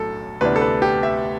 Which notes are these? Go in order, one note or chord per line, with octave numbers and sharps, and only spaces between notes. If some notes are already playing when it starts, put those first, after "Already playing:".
Already playing: B1 A2 F#3 A4
D2 C3 E3 B3 D4 B4
A4
B4
G4
E5